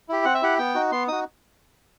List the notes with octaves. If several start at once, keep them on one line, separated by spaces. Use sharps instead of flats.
E4 G4
C4 F#5
E5
E4 G4 F#5
B3 G5
D#4 F#4
B3 C6
D#4 F#4 D#6